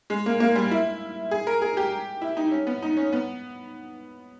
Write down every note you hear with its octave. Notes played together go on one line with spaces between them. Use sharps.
G#3
A#3
A#3
G3
E4
G#4
A#4
G#4
G4
E4
D#4
C#4
B3
D#4
C#4
B3